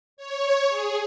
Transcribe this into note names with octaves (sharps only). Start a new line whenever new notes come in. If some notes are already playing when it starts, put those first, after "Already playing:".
C#5
G#4